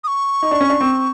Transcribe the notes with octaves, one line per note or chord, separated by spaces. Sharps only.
D#6
C#6
D#4
D4
C#4
D4
C4